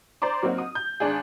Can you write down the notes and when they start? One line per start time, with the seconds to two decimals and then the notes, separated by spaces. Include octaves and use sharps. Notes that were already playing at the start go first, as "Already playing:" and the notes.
0.22 C5 D5 A#5 C6 D6
0.43 F#3 A#3 C4 D#4 F#4
0.58 D#6
0.75 G6
1.00 G#1 D4 G#4